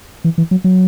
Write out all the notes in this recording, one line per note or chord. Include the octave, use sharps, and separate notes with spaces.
E3
E3
F#3
F#3